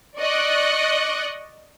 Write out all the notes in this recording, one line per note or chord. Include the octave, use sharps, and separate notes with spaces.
D5 D#5 C#6 F#6